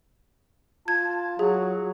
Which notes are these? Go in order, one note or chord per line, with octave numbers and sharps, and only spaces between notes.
F4 A5 G#6
F#3 G#4